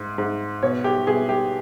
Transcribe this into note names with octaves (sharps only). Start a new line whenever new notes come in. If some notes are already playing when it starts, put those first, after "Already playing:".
Already playing: G#2
G#2
B2 C#5
G4
B2 G#4
G4